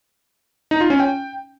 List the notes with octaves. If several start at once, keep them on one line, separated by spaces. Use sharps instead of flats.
D#4
F4
C#4
G5